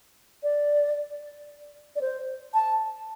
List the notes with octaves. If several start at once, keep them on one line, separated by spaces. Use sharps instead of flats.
D5
D5
C5
A5